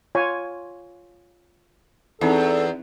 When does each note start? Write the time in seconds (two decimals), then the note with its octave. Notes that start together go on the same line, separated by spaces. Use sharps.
0.15 F4 C#5 G#5
2.21 E2 C4 D#4 E4 A4